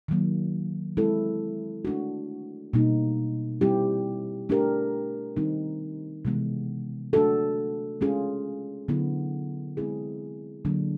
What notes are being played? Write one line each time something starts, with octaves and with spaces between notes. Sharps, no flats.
D#3 F#3 A#3
G#3 C4 E4 A4
A3 D4 F#4
B2 G3 A#3 D#4
G3 C4 E4 G4
A3 D4 G4 A#4
D#3 G3 C4 D#4
C3 E3 G#3 B3
A3 D4 F#4 A4
G#3 C#4 F4 G#4
D3 F#3 B3 E4
G#3 C4 E4 G#4
D3 F#3 A#3 D4